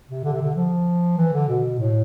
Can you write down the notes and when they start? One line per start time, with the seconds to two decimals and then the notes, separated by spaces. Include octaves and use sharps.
0.09 C3
0.24 D3
0.33 C3
0.41 D3
0.56 F3
1.18 E3
1.33 D3
1.48 B2
1.79 A2